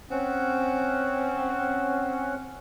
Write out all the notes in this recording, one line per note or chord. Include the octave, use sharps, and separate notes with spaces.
C4 C#4 F#5